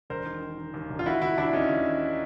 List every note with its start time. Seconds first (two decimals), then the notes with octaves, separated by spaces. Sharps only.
0.10 E1 A#4 C5
0.26 D#3
0.42 D#3
0.58 D#3
0.74 D#2
0.90 E1
0.99 F4
1.06 D#3 E4 F#4
1.22 D#2 E4 F#4
1.38 D#2 D4 E4
1.53 D#2 C#4 D#4
1.70 D#2
1.86 D#3